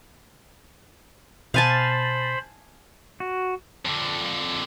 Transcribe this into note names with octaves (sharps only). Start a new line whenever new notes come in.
B2 C5 F5 G#5 A5 B5 A6
F#4
F2 D3